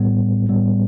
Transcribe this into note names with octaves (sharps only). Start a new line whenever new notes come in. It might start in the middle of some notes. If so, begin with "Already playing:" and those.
Already playing: A2 G3 B3
A2 G3 B3